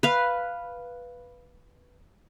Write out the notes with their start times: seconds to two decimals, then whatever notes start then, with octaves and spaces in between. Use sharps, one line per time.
0.03 B4 F5